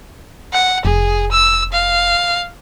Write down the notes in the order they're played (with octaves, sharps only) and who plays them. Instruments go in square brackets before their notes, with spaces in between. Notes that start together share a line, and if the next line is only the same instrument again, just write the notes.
[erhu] F#5
[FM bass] F1 [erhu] G#4
[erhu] E6
F5